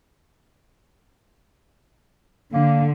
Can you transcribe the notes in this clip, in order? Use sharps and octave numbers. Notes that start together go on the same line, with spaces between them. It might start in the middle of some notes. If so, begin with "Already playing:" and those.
D3 A#3